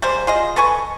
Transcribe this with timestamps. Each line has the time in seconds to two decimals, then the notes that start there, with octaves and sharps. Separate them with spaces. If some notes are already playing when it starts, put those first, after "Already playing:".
0.02 G3 G#3 A#3 C5
0.27 F4 G#4 D#5
0.56 A4 B4 G#5 C#6